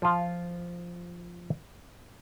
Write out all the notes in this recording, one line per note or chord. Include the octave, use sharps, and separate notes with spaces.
F3 F4